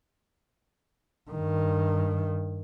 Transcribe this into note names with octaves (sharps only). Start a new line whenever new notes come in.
G2 D#3